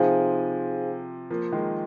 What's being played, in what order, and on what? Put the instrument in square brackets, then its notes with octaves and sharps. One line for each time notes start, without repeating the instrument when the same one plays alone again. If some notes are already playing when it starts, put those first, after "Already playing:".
Already playing: [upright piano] C3 F3 [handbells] D#4 G#4 C5 F5 G#5
[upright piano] F3 A#3
D#3 G#3